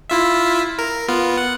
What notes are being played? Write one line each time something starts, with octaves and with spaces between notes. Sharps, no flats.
E4 F4 E5
A#4
B3 F4
F#5